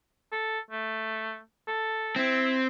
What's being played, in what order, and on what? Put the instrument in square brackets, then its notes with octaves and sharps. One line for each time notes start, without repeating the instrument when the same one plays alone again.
[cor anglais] A4
A3
A4
[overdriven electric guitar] C4 [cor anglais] E4